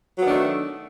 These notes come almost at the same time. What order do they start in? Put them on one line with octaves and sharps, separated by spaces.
F#3 B3 D#3 D4 A3